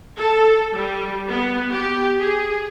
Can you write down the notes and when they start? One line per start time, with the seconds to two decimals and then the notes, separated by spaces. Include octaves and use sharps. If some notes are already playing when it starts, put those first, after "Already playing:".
0.16 A4
0.74 G3
1.29 B3
1.71 G4
2.20 G#4